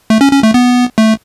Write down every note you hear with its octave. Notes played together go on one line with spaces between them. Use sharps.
A3
C#4
C#4
A3
B3
A3